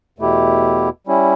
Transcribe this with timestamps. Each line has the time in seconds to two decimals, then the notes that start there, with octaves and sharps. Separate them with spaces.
0.18 E2 B2 A3 E4 G4
1.07 G3 C#4 E4